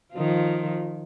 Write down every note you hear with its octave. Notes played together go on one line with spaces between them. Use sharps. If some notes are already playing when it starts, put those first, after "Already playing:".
D#3 F3 F4